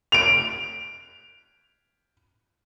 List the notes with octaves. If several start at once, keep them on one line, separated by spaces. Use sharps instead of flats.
D7 F7